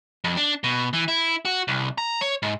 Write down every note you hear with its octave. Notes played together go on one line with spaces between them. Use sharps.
F2
D4
B2
E3
E4
F#4
C2
A#5
C#5
G#2